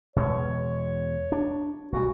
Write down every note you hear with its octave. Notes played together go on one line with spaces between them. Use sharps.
E2 B2 G#3 C#5
D4
B1 A#2 G3 F#4